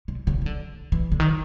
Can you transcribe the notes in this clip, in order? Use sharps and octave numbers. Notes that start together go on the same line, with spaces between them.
C3
C#3
D#3
D3
E3
D3
D#3